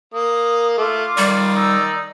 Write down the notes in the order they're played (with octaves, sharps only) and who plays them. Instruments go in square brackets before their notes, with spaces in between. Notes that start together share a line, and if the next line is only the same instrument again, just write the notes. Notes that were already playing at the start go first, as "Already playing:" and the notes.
[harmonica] A#3 [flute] D#6
[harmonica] A3 [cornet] F4 [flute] D6
[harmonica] D#3 D5 [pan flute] G3
[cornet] D#4 [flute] E6